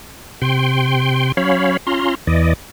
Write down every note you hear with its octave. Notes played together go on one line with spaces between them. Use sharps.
C3 G5 C6
F#3 C#4 C#5 F5 B5
C#4 F4 A#5 C6
E2 E3 D5 D#5